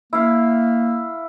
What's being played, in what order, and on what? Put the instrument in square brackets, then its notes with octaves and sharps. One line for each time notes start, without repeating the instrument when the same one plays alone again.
[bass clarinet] A#3 [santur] E4 F5